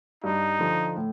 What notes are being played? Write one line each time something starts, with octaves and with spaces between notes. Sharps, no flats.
G2 D#4
D3 F3
A2